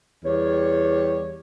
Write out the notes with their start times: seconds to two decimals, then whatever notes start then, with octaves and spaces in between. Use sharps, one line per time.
0.25 E2 G3 G4 C#5